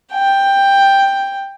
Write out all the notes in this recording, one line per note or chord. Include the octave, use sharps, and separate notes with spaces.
G5